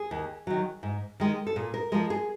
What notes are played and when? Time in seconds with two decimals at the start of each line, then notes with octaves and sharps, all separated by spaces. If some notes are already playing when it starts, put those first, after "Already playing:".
Already playing: G#4
0.11 D#2
0.47 D#3 F#3
0.83 G#2
1.20 D#3 G#3
1.47 A4
1.56 A#2 G#4
1.74 A#4
1.92 F3 G#3 A#4
2.10 G#4